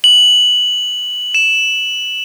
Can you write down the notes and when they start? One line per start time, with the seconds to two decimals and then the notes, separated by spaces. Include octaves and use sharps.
0.04 F#7
1.35 E7